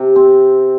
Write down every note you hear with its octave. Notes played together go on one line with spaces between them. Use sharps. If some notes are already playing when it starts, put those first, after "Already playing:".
Already playing: C3
C4